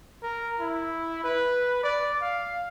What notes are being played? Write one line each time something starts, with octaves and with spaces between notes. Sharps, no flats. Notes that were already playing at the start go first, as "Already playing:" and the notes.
A#4
E4
B4
D5
F5